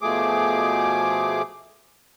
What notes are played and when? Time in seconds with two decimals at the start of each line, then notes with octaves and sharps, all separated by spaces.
0.02 B2 F3 A3 G#4 D6